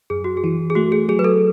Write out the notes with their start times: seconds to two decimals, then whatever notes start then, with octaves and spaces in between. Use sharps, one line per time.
0.10 F#2 G#4
0.24 F#4
0.37 G#4
0.44 E3
0.70 G#4
0.75 A3 F#4
0.92 G#4
1.09 F#3 G#4
1.19 B4
1.24 A4